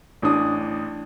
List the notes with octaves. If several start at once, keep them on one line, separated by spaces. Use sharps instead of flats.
A1 D4 D#6